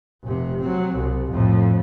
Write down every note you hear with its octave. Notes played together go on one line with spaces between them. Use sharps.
F1 C3
F#3 C4
C2
F2 A2